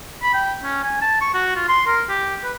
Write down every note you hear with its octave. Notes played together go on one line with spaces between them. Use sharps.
B5
G5
C#4
G#5
A5
C#6
F#4
F4
C6
A#4
G4
B4